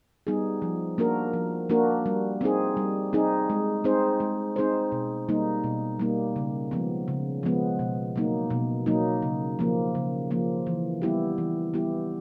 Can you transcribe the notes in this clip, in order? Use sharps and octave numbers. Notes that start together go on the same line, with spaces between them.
G3 B3 D#4 G#4
F3
A#3 D4 F#4 A#4
F3
A#3 D4 F#4 A#4
G3
C4 D#4 G#4
G3
C4 D#4 G#4
G#3
C4 D#4 G#4 C5
G#3
C4 D#4 G#4 C5
B2
G3 A#3 D#4
B2
G3 A#3 D#4
C#3
F3 G#3 B3
C#3
F3 G#3 B3
B2
F#3 A#3 D#4
B2
F#3 A#3 D#4
C#3
F3 A#3
C#3
F3 A#3
E3
G3 B3 E4 G4
E3
G3 B3 E4 G4